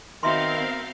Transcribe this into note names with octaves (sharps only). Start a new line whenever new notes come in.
D#3 B3 C4 F#4 A#4 E5 F5 C6